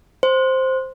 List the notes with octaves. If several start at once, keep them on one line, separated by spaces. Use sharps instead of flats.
C5